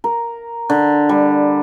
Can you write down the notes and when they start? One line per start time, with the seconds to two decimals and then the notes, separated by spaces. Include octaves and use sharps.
0.04 A#4
0.70 D3
1.09 G3